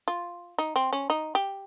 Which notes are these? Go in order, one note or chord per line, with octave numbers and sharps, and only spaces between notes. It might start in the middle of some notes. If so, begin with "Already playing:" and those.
F4
D#4
C4
C#4
D#4
G4